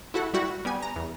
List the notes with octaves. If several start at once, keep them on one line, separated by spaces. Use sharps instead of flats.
E4 F#4 A4 F#5
G3 E4 F#4
G3 B3 G#5
A#5
E2